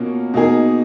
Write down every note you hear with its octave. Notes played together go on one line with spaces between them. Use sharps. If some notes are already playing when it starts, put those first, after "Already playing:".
Already playing: B2 A#3 C#4 F4
B2 A#3 D#4 G#4